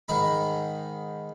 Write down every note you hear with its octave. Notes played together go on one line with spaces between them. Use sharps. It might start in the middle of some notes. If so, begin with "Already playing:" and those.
G#2 D#3 D#4 B5